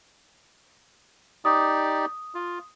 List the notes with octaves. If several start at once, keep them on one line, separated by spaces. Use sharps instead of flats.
D#4 G4 D5 D#6
F4